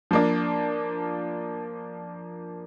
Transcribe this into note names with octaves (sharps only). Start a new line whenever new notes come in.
F3 A#3 D4